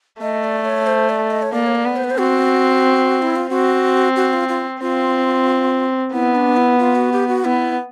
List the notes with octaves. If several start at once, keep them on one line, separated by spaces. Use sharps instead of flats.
A3 D#5
D5
C#5
C5
D5
D#5
C#5
A#3 D5
C#5
D5
B3
C5
B4
C5
C4 F#4
E4
F4
C4 F#4
F#4
F4
F4
C4 F4
B3 E4
D4
E4
F4
F#4
G4
F#4
B3 E4